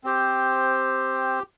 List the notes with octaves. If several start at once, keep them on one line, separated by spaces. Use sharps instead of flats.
C4 G4 C5